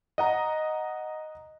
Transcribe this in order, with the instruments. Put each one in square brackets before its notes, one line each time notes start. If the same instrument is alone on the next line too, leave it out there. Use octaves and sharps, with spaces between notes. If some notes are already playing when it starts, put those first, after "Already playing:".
[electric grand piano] D#5 F#5 A#5